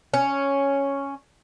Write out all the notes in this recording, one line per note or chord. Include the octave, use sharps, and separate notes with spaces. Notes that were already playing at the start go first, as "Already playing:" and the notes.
C#4